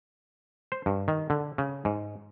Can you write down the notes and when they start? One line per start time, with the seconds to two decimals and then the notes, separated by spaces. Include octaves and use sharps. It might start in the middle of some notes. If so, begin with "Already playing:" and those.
0.72 C5
0.86 G2
1.08 D#3
1.30 D3
1.58 C#3
1.85 G#2